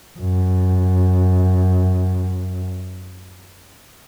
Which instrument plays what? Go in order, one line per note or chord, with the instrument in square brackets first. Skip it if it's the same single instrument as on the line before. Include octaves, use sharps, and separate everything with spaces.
[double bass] F#2